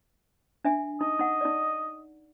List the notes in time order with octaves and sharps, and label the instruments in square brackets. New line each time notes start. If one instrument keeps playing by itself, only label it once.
[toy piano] D4 E5 G#5
[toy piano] D#4 [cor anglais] D#5
[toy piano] D#4 F#5
D#4 D5